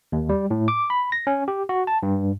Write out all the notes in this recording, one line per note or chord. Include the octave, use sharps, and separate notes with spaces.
D#2
G3
A2
D6
B5
A#6
C#4
G4
F#4
A5
G2